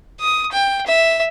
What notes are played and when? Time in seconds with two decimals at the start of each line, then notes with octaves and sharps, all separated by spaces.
0.20 D#6
0.52 G5
0.86 E5